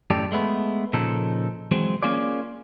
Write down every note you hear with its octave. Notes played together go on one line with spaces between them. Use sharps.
F#2 A2 G4 A4 D5
G#3 A3 B3
A#2 C#3 F3 D#4 A4
E3 F#3 G#3 C4
A#3 C#4 F4 G#4 D5